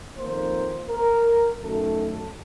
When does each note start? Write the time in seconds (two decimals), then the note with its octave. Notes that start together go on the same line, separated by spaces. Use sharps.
0.16 F2 D#3 A#3 C5
0.89 A#4
1.61 F#2 D#3 A3 A4